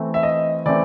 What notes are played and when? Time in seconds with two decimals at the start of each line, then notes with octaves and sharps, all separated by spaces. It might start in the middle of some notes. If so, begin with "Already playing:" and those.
Already playing: E3 A3 C4
0.14 E5
0.23 D#5
0.66 E3 A3 C4 D5